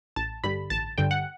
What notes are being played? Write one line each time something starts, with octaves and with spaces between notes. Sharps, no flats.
A1 A5
G2 D3 G3 B5
A1 A5
G2 D3 G3 G5
F#5